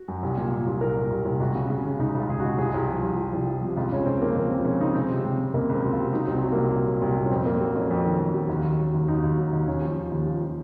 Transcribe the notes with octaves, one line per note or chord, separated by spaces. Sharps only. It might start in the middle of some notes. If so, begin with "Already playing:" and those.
Already playing: F#4
F#2
C2
A#2
A#2
C2
C2 A#4
A#2
C2
C2
C#2 F#4
C#3
C#3
C#3
C#2 D#4
C#2
F4
C#2 G#4
C#2 F#4
C2 G#4
C2
F3
C2
F3
C2
F3
C3
C#2 F4
C#2 C#4
C#2 C4
F3 A#3
C#2 A#3
F3 C4
C#2 C#4
C#3 D#4
C#2 C4
C3
C3
C3
C#2 A#3
C#2 C4
F#3
F4
C3
F#3 D#4
C2
C4
F#3
C2 A#3
A#2
F#3
C2
A#2
C#4
F2 C4
F2 A#3
F#3 C4
F2 C#4
F2
D#3
F2
F#3
D#2
D#2
F#3
D#2
D#2 D#4
D#2
F#3
D#2
D#2 C#4
F3
D#2
D#2
F3
F3